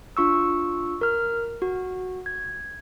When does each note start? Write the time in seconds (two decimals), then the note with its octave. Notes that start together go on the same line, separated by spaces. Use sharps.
0.17 D4 F4 C#6 E6
1.01 A#4 F6
1.62 F#4
2.26 G#6